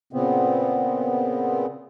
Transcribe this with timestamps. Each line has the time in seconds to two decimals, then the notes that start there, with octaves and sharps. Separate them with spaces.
0.13 A#2 C#3 B3 C4